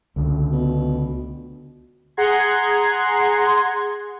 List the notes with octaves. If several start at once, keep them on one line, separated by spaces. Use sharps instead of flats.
C#2 D3
B2
G#4 F#5 A#5 C6 G#6